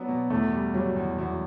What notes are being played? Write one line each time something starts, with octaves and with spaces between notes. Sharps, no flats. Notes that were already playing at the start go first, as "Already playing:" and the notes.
Already playing: F#3 B3 D4
B2
E2 A3
G3
F#3 G3
E2
E2 F#3